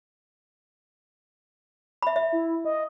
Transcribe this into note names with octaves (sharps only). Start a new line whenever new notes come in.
E5 B5
E5
E4
D#5